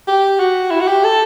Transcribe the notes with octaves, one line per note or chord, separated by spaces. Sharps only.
G4
F#4
E4
F#4
G4
A4